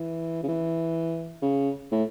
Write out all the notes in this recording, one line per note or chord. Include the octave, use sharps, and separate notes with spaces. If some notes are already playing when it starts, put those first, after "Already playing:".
Already playing: E3
C#3
E3
C#3
A2